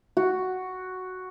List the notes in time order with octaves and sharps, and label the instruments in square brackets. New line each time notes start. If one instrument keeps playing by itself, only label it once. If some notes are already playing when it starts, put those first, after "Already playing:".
[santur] F#4